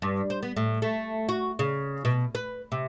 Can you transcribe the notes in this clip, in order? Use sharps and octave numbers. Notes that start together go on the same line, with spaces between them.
G2
C5
B3
A2
A3
F#4
C#3
B2
B4
C3